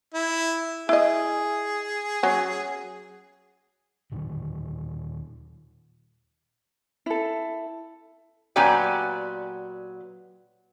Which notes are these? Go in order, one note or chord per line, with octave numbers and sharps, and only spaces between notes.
E4
E4 G#4 D#5
F#3 C#4
D#2 A#2 D3 D#3
E4 A4
A#2 F#3 B3 G4 D5 G#5